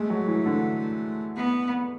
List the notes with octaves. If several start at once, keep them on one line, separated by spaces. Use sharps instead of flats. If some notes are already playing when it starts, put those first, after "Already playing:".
Already playing: G#3 A3
F#3
E3
D3
B3